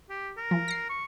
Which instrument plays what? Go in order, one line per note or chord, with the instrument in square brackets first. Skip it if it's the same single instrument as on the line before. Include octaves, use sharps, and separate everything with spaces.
[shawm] G4
A#4
[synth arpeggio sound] F3
A#6 C7
[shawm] C#6